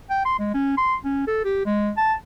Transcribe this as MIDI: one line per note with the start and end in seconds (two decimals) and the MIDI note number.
0.10 0.25 79
0.25 0.35 84
0.39 0.51 56
0.54 0.76 61
0.78 0.96 84
1.05 1.26 61
1.27 1.40 69
1.45 1.61 67
1.66 1.91 56
1.97 2.14 81